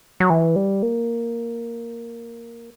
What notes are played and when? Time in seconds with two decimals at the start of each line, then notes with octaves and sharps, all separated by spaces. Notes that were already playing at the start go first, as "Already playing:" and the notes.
0.20 F#3
0.30 E3
0.56 G3
0.83 A#3